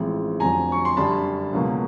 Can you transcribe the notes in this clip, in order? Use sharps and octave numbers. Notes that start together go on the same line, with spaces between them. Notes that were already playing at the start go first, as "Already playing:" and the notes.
Already playing: A1 A2 F3 G#3 C4
F1 F2 D3 F#3 G#5 A#5
C#6
C6
F#2 D3 G3 A5 B5
C#2 B2 F#3 A#3